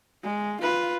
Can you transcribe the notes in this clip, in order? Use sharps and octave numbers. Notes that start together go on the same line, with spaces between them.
G#3
F4 B4